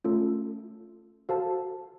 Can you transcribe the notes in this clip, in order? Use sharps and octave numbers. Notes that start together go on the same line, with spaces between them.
A3 C#4 F4 A4
F#4 A4 C5 F5 A5